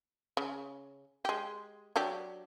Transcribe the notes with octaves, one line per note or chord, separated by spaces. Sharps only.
C#3
G#3 G4
F#3 D4 G4